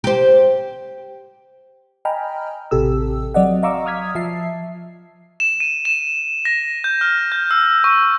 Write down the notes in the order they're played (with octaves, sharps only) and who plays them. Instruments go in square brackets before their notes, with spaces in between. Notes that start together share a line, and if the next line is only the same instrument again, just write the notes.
[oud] G4 C5
[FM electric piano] D#5 G5 G#5 A#5 B5 F6
A1 C3 G4 A4 E6
F#3 C4 D5 D#5 F#5
D#5 F5 A#5 C#6 D6 E6
D#6 F6 G#6 B6
F3 E5 A5 C7
[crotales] E7
D#7
E7
A#6
G6
F6
G6
E6
C#6